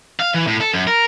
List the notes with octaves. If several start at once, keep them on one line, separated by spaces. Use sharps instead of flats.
F5
E3
A2
A4
F#2
A#4